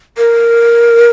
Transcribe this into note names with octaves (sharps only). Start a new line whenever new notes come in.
A#4